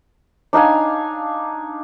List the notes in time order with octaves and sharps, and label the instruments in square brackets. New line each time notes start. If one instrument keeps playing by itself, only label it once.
[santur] D4 D#4 F5 G#5